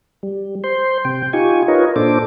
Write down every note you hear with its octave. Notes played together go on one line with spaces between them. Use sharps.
G3
C5 C6
C3 G5
D#4 F4 G4 G#5 C#6
D#4 F4 A#4 B4 C#5 D#5
A#2 D4 A4 C5 D6